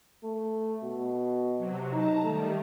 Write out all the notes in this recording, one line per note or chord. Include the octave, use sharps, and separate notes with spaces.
A3
B2
C3 F#3
D#4 A5 A#5
D#3 G3 A3